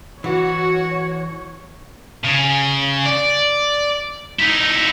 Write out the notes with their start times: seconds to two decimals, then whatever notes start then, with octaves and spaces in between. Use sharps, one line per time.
0.24 E3 F#4 C#5
2.25 C#3
3.06 D5
4.39 D#4 E4